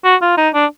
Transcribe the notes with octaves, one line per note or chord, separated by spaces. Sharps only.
F#4
F4
D#4
D4